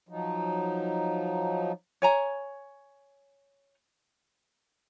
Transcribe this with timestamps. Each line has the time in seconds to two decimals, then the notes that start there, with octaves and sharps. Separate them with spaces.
0.09 F3 F#3 D#4
2.02 C#5 G#5 A#5